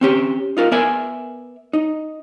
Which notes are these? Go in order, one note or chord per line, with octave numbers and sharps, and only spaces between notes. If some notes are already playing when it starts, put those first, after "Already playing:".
C4 C#4 G4
D#4 F4 A#4
B3 A#4 D5 E5 G#5
D#4